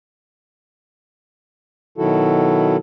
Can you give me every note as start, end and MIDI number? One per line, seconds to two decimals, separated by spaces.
1.98 2.77 47
1.98 2.77 51
1.98 2.77 54
1.98 2.77 64
1.98 2.77 66
1.98 2.77 69